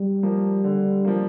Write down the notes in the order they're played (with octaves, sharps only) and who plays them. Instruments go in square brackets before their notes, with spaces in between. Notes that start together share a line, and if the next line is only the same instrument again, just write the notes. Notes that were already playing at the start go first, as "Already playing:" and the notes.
Already playing: [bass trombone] G3
[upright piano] F3 A#3
D3
F3 A#3